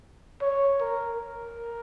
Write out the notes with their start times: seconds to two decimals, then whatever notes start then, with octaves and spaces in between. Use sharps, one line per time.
0.42 C#5
0.81 A#4
1.20 A#4